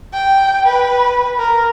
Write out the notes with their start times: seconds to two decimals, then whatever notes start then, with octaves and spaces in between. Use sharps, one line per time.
0.13 G5
0.66 B4
1.38 A#4